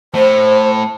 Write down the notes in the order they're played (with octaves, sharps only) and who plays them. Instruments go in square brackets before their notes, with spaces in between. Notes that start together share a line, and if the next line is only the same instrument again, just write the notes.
[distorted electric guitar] A2 [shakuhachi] C5